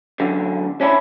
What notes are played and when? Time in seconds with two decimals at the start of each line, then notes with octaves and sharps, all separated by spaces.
0.20 F#2 D3
0.81 C#4 D4 E4